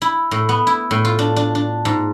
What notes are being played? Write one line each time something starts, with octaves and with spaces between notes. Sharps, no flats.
E4
A2
B3
E4
A2
F4
D4
D4
D4
G#2